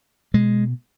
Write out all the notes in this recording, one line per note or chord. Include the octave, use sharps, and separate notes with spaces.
B2 G#3